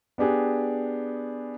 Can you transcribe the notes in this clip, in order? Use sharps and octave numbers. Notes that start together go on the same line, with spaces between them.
B3 D4 G4 G#4